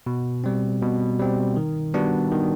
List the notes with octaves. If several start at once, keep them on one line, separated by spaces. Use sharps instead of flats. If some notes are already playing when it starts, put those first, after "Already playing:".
B2
G3 C4
B2
G3 C4
D#3
G3 B3 D4 F#4
D#3